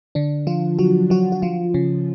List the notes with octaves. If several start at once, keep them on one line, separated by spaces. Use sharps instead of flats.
D3 D4
F3 F4
F#3 F#4
F#3 F#4
F#4
F3 F4
C#3 C#4